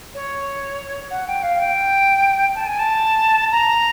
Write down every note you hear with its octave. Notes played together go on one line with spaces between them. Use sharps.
C#5
F#5
G5
F5
G5
A5
G#5
A5
A#5